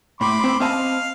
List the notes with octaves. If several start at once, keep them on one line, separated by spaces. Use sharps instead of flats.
A2 B5 C6 D6
C4
C4 D#5 F5 A5